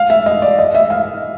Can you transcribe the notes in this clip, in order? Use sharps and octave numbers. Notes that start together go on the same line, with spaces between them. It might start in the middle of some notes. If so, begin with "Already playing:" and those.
Already playing: F5
E5
D#5
D5
D#5
E5
F5